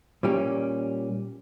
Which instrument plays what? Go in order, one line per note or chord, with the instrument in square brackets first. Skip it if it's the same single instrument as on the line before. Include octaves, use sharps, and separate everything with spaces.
[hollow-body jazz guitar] A#2 G3 C#4 G4